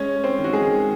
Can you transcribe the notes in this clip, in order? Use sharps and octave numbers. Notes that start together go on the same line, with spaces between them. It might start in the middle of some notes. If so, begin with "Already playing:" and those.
Already playing: G#3 C#4 C#5
G#3
C4 C5
D#3
F#4
G#3 G#4
D#3